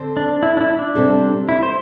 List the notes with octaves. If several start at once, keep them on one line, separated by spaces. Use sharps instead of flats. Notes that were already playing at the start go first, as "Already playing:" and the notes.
Already playing: D3 C4 A4 C5
D4
E4
D4
E4
D4
C3 G3 C4 A4
E4
C5